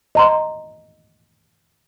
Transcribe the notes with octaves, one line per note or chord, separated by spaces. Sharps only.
D#5 A#5 C6